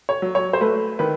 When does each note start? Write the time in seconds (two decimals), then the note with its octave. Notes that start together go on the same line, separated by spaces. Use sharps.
0.09 C#5
0.22 F#3
0.35 C#5
0.53 C5
0.61 A3 B4
0.99 D#3 B4